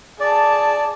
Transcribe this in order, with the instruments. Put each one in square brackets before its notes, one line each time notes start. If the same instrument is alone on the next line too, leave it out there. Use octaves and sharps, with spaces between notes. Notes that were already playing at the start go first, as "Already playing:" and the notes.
[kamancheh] G#4 A5 [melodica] D5